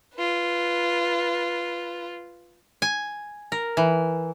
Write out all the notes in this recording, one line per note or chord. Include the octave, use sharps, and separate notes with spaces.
F4 B4
G#5
A#4
E3